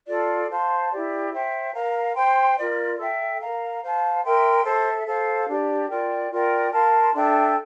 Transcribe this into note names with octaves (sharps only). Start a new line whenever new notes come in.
F4 A4 D5
C5 F5 A5 C6
E4 G4 D5
C5 E5 G5
A#4 F5 A#5
C5 G5 C6
F4 A#4 D5
A4 E5 G5
A#4 F5 A#5
C5 F5 A5
A#4 E5 G5 C6
A4 C5 E5
A4 C5 F5
D4 G4 D5
F4 A#4 D5 G5
F4 A#4 D5 G5
A#4 F5 A5 C6
D4 A4 E5 G5